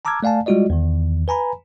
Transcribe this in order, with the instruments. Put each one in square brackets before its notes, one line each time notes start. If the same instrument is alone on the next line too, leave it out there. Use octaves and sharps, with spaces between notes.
[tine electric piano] A5 A#5 D6 E6 F6 G#6
A3 D5 F5 G#5 A5
G3 G#3 F4 F#4 D5 D#5
E2 D#3
B4 G#5 A#5 B5